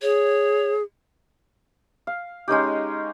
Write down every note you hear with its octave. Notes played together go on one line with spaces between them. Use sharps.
G#4 C#5
F5
G#3 C#4 D#4 G4